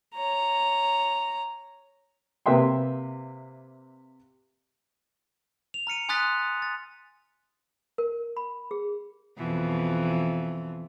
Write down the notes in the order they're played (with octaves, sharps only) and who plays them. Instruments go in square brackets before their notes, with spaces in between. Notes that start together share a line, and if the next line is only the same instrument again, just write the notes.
[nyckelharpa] C#5 A#5
[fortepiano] C3 A#3 B4 E5 G5 C6
[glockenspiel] F7
A#5 F6 C#7 D#7
G#5 C6 D#6 F#6 A6 B6
A6
[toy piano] A#4
B5
G#4
[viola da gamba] F2 B2 E3